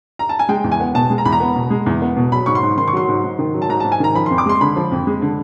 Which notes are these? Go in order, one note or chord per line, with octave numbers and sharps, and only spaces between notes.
A#5
A5
G#5
G#3 G5
E2
G#5
B3
B2 A5
G#3
A#5
E2 B5
A#5
B3
B2
G#3
E2
B3
B2
F#3 B5
G#2 C#6
C6
G#2
D#3 C6
C#6
F#3 C6
G#2
G#2
D#3
F#3
A5
G#2 A#5
A5
G#2
G#5
D#3 A#5
F3 B5
C6
F2
D6
G#3 C6
D3 B5
F3
F2
G#3
D3